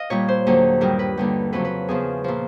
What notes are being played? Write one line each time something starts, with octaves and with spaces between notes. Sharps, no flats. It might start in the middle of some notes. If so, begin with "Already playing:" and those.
Already playing: D#5 F5
A#2 G3 C#5
C5
D#2 D3 F#3
G2 D#3 G3 A#4
B4
D#2 D3 G3
F2 C#3 F#3 B4
B4
E2 C#3 F3 G#4
A#2 F3